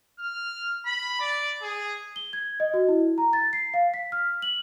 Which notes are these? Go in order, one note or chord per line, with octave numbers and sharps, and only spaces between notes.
F6
B5
D5
G#4
G7
G#6
D#5
F#4
E4
A#5
A6
C7
F5
B6
F6
F#7